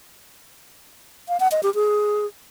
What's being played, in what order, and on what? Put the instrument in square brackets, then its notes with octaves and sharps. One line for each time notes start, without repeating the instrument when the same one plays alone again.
[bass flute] F5
F#5
D#5
G4
G#4